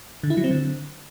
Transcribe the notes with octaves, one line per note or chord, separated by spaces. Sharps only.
D3
E4
F#3
C4
D3